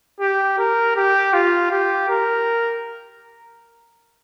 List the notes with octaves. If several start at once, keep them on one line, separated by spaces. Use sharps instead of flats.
G4
A#4
G4
F4
G4
A#4